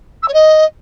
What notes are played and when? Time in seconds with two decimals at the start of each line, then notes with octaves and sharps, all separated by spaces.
0.22 E6
0.28 C#5
0.33 D#5